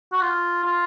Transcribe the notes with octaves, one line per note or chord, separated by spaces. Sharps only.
F#4
F4
F4